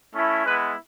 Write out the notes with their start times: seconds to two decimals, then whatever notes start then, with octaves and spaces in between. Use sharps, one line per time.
0.14 A3 C#4 E4
0.46 G#3 B3 E4 B4